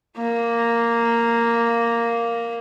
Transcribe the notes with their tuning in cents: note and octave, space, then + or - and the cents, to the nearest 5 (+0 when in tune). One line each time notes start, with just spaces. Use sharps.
A#3 -5